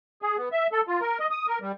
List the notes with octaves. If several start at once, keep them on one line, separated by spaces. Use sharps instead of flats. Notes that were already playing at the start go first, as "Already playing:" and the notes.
G#4
B3
E5
A4
F4
A#4
D#5
D#6
A#4
G3